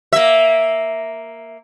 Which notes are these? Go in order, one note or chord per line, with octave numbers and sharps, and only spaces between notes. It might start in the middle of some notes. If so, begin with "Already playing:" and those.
A#3 E5